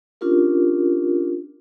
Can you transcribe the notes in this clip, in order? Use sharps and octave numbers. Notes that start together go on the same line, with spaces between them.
C#4 D4 F4 G4 A#4